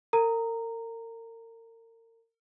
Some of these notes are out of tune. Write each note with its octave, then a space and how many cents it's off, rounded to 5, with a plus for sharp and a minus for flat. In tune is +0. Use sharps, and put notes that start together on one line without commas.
A#4 -40 A#5 -15